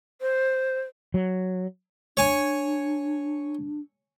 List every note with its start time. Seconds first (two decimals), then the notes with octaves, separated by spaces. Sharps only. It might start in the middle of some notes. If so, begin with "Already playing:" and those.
0.21 C5
1.14 F#3
2.17 D4 C#5 G#5 C#6